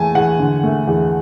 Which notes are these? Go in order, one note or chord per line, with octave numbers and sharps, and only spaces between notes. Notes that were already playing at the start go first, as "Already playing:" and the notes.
Already playing: E2 A3 G#5 A5
E2 F#5
D3
A3
E2